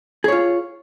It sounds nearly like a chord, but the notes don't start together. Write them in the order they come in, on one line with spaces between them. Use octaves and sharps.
G#4 C#5 F4